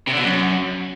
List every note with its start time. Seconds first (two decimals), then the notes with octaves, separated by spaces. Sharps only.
0.07 C3
0.13 D3
0.18 B2
0.23 F#2